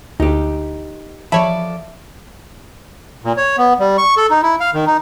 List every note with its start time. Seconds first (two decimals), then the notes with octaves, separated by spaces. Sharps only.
0.20 D2 D#4 G4
1.32 F3 A4 C#5 D5 E5 A5 B5
3.24 A#2
3.37 C#5
3.58 B3
3.79 G3
3.98 C#6
4.17 A4
4.30 D#4
4.43 E4
4.60 F5
4.74 D#3
4.86 D#4